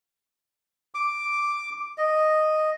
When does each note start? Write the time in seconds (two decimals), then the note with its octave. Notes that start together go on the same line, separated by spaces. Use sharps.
0.95 D6
1.98 D#5